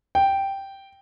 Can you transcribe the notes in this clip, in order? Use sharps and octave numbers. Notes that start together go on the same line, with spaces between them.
G5